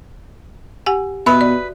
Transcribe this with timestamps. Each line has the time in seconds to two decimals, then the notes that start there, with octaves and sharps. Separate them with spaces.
0.86 G4 F#5 G#5
1.26 B2 F#4 B4 E5 B5 D#6
1.41 D5